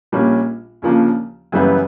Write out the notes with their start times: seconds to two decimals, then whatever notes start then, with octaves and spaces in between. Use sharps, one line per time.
0.12 A#1 A#2 G3 A#3 C#4
0.82 D#2 C#3 F3 A#3 D4
1.52 F#2 C#3 E3 G3 B3